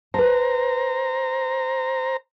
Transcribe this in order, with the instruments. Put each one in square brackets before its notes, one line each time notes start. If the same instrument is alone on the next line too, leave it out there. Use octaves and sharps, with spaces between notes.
[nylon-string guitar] B4 A5 [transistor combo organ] C5 A#5